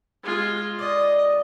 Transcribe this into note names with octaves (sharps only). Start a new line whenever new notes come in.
G#3 F4
D3 D5 D#5